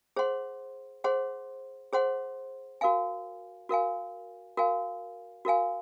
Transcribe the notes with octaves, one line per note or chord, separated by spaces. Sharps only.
G#4 C5 F#5 C6
G#4 C5 F#5 C6
G#4 C5 F#5 C6
F#4 A#4 F5 G#5
F#4 A#4 F5 G#5
F#4 A#4 F5 G#5
F#4 A#4 F5 G#5